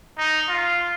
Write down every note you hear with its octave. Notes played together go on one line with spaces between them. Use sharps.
D#4
F4